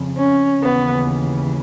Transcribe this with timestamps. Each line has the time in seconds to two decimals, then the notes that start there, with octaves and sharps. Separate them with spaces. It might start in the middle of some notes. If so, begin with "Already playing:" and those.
Already playing: F2 C#3
0.16 C#4
0.62 D#2 C#3 E3 B3